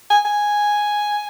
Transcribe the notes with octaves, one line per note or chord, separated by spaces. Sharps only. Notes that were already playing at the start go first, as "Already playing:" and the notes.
G#5
G#5